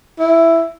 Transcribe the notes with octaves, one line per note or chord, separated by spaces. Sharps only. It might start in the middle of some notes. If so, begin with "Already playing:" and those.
E4